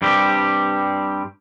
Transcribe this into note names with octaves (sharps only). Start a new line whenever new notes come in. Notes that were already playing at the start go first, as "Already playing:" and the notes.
G2 G3 C4 G4